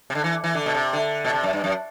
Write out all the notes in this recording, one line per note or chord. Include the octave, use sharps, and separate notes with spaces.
C3
D3
E3
E3
D3
B2
C3
D3
B2
C3
F#2
G2
F#2